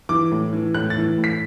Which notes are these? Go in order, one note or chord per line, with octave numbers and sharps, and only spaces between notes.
E3 D6
A2
E3
A2 F#6
A6
E3
A2
B6